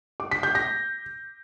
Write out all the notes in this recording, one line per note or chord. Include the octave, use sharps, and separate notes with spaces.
D6
B6
G6
A#6